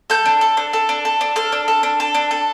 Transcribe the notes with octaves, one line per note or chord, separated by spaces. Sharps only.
A4 G6
D4
A4
D4
A4
D4
A4
D4
A4 F6
D4
A4
D4
A4
D4
A4